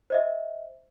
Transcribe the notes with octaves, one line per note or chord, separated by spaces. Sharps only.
C5 D#5 E5